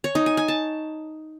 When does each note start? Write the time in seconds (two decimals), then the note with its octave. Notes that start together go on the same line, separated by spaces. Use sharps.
0.04 C#5
0.15 D#4
0.26 G#5
0.37 G#5
0.48 A5